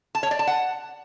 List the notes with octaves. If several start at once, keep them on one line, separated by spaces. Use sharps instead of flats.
A5
C#5
D5
A5
F#5